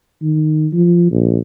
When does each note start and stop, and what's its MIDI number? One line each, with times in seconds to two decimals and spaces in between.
0.22 0.68 51
0.73 1.09 53
1.11 1.38 34